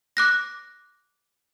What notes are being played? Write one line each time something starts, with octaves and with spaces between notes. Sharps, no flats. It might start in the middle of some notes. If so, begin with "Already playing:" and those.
D6 F#6 A#6